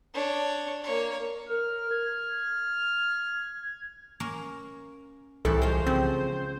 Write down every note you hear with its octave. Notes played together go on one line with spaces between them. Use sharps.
D4 C#5
A#3 C#5
A#4 F6
G#6
A#3 C#4 A#4
C2 A2 E3 G3 A4
G#3 C#4 F4 C5
C#3 F3 C4